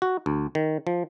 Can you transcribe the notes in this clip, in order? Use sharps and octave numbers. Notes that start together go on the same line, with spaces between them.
F#4
D2
D#3
F3